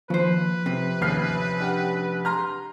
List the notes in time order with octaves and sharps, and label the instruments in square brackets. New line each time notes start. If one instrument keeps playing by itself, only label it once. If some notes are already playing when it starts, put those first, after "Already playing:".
[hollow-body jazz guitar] D#2 C5 [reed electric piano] F3 [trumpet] B4
[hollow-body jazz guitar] F2 C3
[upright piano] A1 F6 C7 [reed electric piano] D#2 G6 G#6
[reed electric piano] D4 G4 F#5
[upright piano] A#5 C6 F6